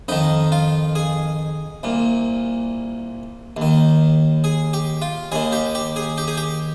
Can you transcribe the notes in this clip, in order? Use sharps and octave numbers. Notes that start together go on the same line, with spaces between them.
F2 D#3 D#4
F4
G#4
C2 A#2
D#2
D#3
G#4
G4
F4
D#2 D#3 G#4
G4
G4
G#4
G4
G#4
G4